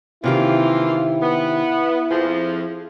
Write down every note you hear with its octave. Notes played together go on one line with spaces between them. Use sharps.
C3 D#3 E3 A#3 E4 F4 G4
B3
F2 F3 G#4